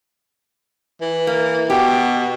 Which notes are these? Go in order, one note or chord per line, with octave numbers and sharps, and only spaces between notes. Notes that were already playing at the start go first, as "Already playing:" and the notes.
E3
A#3
B2 G4